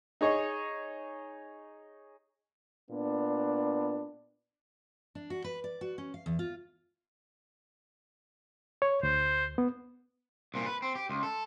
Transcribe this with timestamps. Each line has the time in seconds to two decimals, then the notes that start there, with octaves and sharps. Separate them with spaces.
0.21 D#4 G#4 C#5 D#5
2.90 A#2 B3 D4
5.15 D4
5.30 F#4
5.44 B4
5.64 D5
5.81 F#4
5.98 C#4
6.14 F5
6.26 E2
6.39 F4
8.82 C#5
9.03 D2 C5
9.58 B3
10.54 C2 A#2
10.66 B4
10.82 C4
10.95 G4
11.09 C#2
11.23 A4